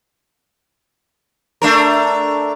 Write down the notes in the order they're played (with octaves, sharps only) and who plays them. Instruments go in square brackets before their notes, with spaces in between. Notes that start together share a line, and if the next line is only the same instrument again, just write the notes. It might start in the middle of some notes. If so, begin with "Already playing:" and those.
[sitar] A3 D4 A#4